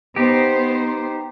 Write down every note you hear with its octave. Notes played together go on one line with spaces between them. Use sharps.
B3 D#4 G4 C5